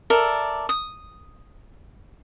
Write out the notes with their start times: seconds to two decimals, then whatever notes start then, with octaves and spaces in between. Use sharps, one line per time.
0.10 A4 A#4 D5 E5
0.69 D#6